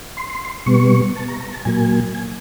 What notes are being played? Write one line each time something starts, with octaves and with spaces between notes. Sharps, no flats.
C6
B2 G3 B3 C#6
A5
A#5
A#5
A5
A#2 F#3 A#3 G#5
G#5